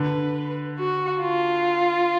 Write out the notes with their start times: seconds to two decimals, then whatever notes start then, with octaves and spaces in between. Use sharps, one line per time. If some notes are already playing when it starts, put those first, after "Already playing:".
Already playing: D3 B4
0.79 F#4
1.22 F4